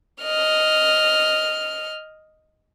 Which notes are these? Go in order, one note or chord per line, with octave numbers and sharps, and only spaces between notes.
D#5 F6